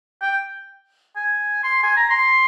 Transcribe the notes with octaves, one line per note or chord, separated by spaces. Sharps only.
G5
G#5
C6
G#5
A#5
C6